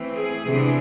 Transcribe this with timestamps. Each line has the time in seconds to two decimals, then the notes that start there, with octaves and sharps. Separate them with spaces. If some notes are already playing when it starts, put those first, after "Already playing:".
Already playing: E3 A3 C4
0.16 G#4
0.45 C3 E3 B3 D4